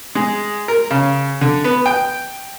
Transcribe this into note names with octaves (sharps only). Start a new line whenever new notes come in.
G#3
A#4
C#3
D3
B3
G5